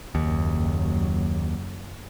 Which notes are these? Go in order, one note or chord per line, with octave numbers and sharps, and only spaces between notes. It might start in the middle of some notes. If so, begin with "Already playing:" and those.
F#1 D#2 F#3